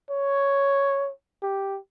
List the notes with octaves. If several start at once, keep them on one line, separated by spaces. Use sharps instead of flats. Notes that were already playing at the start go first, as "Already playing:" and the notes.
C#5
G4